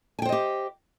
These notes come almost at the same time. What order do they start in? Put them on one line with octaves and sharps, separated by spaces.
G#5 G5 C5 D#5 G4